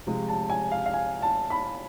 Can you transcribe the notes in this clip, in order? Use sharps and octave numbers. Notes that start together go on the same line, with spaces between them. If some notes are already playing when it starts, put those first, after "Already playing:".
C3 F3 G#3
A5
G#5
F5
F5
G#5
A5
B5